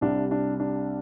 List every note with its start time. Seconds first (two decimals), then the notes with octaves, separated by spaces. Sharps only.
0.01 C2 C3 G3 D4
0.31 D4
0.60 D4